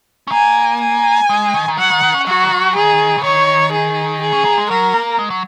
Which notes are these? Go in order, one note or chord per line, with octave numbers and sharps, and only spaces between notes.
C#4
A#3 G#5
G#5
G#3
D#3
D#3
F#3 F#5
D#3
D#3
C#4
F#3 F#4
D#3
F#3
D#3 G#4
C#3
D#3 C#5
G#4
G#4
C#4
A#3
G#3
F#3 A#4
A#3
G#3
F#3